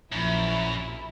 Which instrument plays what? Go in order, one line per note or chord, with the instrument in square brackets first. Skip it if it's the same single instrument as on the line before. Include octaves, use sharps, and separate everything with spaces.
[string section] A#1 E4 [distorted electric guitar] F#2